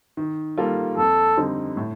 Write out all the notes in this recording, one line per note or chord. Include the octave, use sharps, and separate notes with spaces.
D#3
G3 A#3 F4 A4
F2 A4
D3 G3 C4 D#4
A2